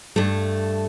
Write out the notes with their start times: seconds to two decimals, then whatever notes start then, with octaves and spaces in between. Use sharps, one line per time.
0.16 G2 A3